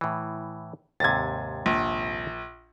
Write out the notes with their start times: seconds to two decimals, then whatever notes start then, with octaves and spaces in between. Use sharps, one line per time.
0.01 A2 E3
1.00 D#2 G#2 C3 G#6 A6
1.66 A#1